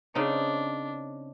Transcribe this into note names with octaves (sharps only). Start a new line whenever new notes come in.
C#3 C4 D4 D#4